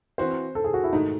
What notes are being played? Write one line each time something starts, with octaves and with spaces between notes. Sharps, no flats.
E3 C4 F#4 C5
A4
G#4
F#4
E4
G#2 D#3 A3 D#4